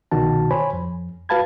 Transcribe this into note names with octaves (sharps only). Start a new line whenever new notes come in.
C2 B2 D#3 F#4 A5
C5 C#5 G#5 B5
F2
F#4 B4 F5 A5 B5 G#6